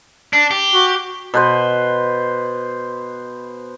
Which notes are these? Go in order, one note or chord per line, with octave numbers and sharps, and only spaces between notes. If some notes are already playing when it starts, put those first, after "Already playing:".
D4
G4
F#4
B2 B4 C5